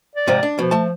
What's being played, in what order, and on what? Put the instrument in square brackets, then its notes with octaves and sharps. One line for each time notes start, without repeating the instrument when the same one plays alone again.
[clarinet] D5
[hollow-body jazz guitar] G#2 C3 F3
D4
[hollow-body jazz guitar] B2 [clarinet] F3
[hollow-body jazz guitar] A3 A5